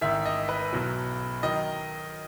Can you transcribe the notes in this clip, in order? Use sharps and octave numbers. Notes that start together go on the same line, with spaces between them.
A1 G#2 D#3 E5
D#5
B4
B1 B2 F#3
D#3 F#3 D#5